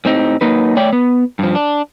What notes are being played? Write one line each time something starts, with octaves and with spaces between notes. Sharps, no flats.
A2 C4 D#4 G4
F#3 A#3 D#4 B4
A3 C#5 D5 E5 G5
B3
G2 F3
D4